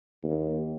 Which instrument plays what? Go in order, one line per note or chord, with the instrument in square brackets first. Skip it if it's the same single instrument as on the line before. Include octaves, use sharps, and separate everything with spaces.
[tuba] D#2